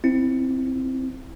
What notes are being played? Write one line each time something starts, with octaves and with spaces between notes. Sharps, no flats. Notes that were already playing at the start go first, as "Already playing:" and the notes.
C4 E4